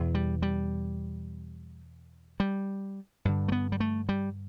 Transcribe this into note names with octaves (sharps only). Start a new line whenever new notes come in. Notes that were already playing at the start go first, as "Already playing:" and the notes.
Already playing: E2 B2
G3
G3
G3
G2 D3
A3
B3
G3
A3
G3